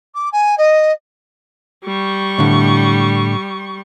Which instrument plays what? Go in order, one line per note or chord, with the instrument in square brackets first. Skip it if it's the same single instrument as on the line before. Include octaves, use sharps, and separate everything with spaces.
[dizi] D6
G#5
D#5
[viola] G3 C#6
[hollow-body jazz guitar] A2 D3